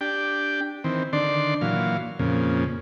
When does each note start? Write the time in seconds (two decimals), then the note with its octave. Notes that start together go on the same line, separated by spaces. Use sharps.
0.01 D4 G4 G5
0.84 D#3 E3 C4
1.13 D3 D#3 D4 D5 C6
1.61 A#2 E3 F#3 F5
2.19 F2 A#2 C#3